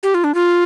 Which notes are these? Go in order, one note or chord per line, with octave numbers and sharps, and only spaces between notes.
G4
F4
D4
F4